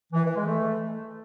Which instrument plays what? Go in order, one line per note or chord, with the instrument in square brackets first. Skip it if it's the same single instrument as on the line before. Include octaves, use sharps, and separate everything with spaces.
[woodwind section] E3
E3
G#3
A3